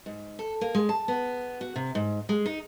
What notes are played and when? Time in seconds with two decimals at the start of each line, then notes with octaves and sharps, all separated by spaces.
0.06 G#2
0.39 A4
0.61 A#3
0.75 G#3
0.89 A5
1.08 B3
1.61 F#4
1.76 C3
1.95 G#2
2.29 G#3
2.46 D#4